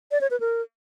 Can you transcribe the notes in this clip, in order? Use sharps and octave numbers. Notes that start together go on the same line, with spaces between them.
D5
C#5
B4
A#4